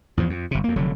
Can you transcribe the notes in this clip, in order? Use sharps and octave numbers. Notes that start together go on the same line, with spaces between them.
E2 G#2 F3
F2
G1 C3
F2 A#3
F1 D3 F#3